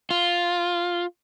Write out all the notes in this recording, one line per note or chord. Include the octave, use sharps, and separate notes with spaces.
F4